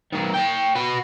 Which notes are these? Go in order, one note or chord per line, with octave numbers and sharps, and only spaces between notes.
D#3 F#3
C#5 G5
F#4 B4